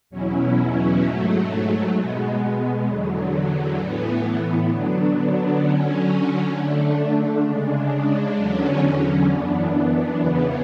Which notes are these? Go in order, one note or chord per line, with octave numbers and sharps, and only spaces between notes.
E2 B2 F#3 C#4 E4
G#2 F#3 A3
B2 G#3 B3
E2 D3 F#3
A2 E3 B3
D3 F#3 B3 D4
D3 F#3 C#4
D3 A3 D4
C#3 G#3 D4
E2 D3 F#3 C#4
F#2 E3 B3 D4
E2 C#3 E3 B3